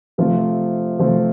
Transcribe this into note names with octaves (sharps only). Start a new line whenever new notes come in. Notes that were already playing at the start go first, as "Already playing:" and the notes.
C3 F3 A3 C4 F4
C3 F3 A3 C4 F4